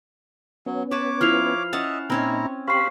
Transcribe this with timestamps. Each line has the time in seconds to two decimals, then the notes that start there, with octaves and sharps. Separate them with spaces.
0.66 F#3 B3 C#4
0.91 B4 C#5 A5 D6
1.21 F3 E4 F6 C7 F7
1.73 C#4 D#5 E5 F#5 A5
2.10 A#2 C4 C#4 D#4 E4 C#5 A#5
2.68 C4 G4 C5 F5 B5 C#6 C7